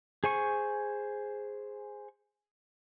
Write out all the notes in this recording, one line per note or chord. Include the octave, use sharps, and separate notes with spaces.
G#4 C5 G#5 C#6